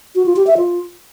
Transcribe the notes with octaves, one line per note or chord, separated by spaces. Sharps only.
F#4
F4
G4
E5
F4